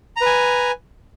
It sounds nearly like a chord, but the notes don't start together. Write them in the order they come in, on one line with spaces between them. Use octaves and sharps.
A#5 B4 G#5